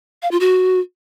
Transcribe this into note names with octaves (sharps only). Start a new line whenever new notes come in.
F5
F4
F#4